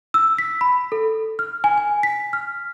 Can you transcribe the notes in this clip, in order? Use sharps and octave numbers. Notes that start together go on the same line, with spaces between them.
E6
B6
B5
A4
F6
G#5
G#5
B6
F6